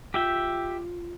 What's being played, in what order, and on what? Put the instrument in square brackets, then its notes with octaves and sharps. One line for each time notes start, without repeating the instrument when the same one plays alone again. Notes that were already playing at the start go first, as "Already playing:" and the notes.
[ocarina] F4 [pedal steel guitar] G4 E5 G5